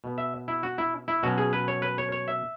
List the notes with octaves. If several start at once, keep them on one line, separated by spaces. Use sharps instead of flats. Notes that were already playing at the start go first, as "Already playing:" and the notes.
B2 B3
E5
E4
F#4
E4
E4
B2 F#3 C#4 F#4
G#4
B4
C#5
B4
C#5
C#5
E5